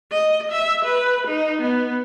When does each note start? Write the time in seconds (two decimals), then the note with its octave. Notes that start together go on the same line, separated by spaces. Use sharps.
0.12 D#5
0.52 E5
0.85 B4
1.27 D#4
1.61 B3